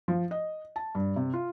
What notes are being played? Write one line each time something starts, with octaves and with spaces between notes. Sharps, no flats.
F3
D#5
A5
G2
C3
F4